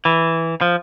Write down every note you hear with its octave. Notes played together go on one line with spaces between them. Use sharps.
E3
F3